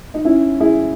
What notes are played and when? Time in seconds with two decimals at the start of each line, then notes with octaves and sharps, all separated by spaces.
0.14 D#4
0.24 C#4 E4
0.60 E4 G#4